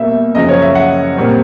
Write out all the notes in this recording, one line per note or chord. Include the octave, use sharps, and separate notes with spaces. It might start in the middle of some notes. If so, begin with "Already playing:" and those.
Already playing: B2 G3 A#3 E5
F#2 C#3 F3 D#5
C#5
E5
F#5
A#2 G3 C4